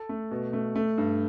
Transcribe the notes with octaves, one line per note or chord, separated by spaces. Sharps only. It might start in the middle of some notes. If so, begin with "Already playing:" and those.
Already playing: A4
A3
B2
A3
A3
G2